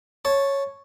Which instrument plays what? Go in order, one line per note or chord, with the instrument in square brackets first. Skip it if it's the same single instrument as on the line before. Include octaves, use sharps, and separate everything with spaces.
[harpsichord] C#5 A5